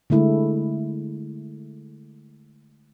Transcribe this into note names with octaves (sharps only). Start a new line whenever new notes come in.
D3 G#3 A3 E4